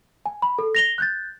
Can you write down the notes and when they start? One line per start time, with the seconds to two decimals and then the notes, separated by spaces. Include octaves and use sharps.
0.26 G#5
0.42 B5
0.59 A4
0.75 A#6 F7 G7
0.98 F#6 G6 A6